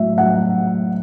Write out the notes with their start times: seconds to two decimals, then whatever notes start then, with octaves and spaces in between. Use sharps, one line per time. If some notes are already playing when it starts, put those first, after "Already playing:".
Already playing: A2 F#3 E5
0.17 A2 F#3 F#5